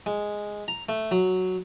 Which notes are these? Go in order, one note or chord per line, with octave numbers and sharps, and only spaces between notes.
G#3
A#5
A3
F#3